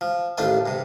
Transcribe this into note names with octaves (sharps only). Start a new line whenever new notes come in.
F3
A1 D#2 A3 D4 F4 C5
G2 C3